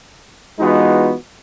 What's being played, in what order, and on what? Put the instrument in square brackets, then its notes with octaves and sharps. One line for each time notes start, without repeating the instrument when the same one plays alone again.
[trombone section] E3 G#3 B3 D#4 F4 F#4